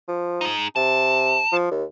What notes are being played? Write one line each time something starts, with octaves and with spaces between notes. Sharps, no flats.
F3
D#4 G#4
C3 A5
F3
D#2